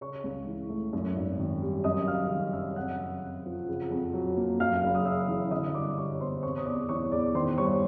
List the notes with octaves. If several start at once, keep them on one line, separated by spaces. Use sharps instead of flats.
C#3 C#5 C#6
C#2
E3
A3
F#2
G#1
D#3
G3
F#2 D#5 D#6
F#1 F5 F6
D#3
F#1 E5 E6
F2 F#5 F#6
F#1
C3
F3
C#3
F2
F#3
A#3
F#2 F5 F6
F#1
D#6
C#3 E5 E6
E3
D3 D#5 D#6
G2 D5 D6
G3 C#5 C#6
B3 C5 C6
C3 C#5 C#6
D#6
E2 D5 D6
E3 C#5 C#6
E2 D5 D6
D#3 C5 C6
G2 C#5 C#6